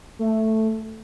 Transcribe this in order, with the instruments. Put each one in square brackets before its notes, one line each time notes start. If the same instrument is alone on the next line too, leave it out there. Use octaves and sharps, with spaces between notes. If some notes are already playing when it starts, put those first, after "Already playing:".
[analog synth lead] A3